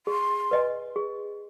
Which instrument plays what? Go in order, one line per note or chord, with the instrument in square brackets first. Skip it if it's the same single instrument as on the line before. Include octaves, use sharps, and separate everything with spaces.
[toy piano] G#4 [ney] C6
[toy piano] B4 D#5 G#5
G#4